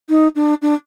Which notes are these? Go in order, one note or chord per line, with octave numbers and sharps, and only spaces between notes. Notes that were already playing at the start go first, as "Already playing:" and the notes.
D#4
D4
D4